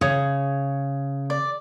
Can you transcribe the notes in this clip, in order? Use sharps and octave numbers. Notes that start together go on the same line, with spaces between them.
C#3 C#5 D#6
D5